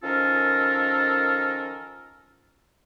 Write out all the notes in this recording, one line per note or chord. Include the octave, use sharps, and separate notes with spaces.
D#3 F3 C#4 F4 A4 A#4